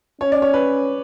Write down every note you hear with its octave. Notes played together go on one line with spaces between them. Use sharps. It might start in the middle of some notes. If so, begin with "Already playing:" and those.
C#4 C#5
D5
C#5
B4